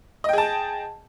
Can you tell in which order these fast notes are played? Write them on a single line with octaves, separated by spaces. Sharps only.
D#5 G5 G#4 A5